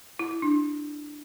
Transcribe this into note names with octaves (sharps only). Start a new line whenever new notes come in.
E4
E4
D4